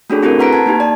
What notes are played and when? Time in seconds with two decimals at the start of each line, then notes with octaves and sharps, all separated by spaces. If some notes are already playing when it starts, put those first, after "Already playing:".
0.10 A3 C#4 D4 F#4 G#4 A4
0.23 C4 E4 F#4 G4 A4 A#4
0.39 B4 F#5 A#5 B6 D7
0.53 A5 G#6
0.66 A#3 D#4 G4
0.80 D5 A5